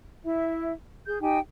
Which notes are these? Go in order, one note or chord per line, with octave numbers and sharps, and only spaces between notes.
E4 E5
G#4 G6
D#4 G4 G5 G#5